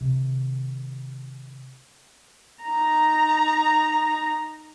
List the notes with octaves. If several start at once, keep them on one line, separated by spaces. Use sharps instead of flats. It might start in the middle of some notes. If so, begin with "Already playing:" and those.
C3 D#3
D#4 A#5